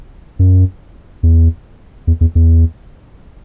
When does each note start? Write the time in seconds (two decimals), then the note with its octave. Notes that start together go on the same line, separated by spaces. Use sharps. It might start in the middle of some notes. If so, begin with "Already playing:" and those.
0.39 F#2
1.23 E2
2.07 E2
2.21 E2
2.35 E2